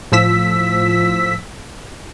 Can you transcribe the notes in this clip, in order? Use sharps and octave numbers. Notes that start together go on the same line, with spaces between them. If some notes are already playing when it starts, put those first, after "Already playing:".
A2 F3 E6 B6